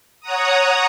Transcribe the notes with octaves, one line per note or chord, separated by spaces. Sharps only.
C#5 F#5 A#5 D#6